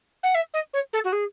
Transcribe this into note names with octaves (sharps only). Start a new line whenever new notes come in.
F#5
E5
D#5
C#5
A4
F#4
G#4